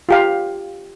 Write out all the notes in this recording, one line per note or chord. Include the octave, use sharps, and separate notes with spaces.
F4 G4 F5